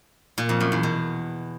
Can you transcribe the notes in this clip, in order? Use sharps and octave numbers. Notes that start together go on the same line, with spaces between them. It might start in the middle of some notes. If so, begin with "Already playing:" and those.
A#2
F2
F#2
E2
B2